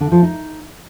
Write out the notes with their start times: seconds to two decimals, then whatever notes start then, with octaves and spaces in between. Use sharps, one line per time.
0.01 D3
0.12 F3
0.23 D#4